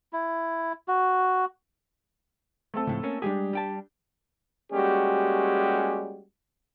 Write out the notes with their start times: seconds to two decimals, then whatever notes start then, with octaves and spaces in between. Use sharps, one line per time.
0.13 E4
0.88 F#4
2.74 A3 C4 A4
2.87 C#2 A2 F3
3.03 A#3 C#4
3.22 G3 G#3 D4 G4 G#4
3.53 G3 G5 A5
4.73 G3 G#3 A#3 C#4 F#4 G4